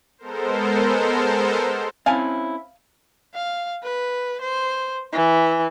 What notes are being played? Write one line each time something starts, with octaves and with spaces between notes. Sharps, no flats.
G#3 B3 A4 A#4 C5
C4 C#4 E4 F5 G#5 A5
F5
B4
C5
E3